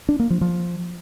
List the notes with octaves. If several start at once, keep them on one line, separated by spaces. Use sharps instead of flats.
D4
A#3
F3
F3